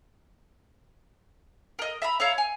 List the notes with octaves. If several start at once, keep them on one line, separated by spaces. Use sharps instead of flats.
A#4 D#5
E5 A#5 B5
C#5 E5 F5 A#5
G#5